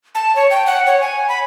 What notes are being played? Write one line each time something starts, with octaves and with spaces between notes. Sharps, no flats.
A5
C#5
G5
F#5
C#5
G#5
B5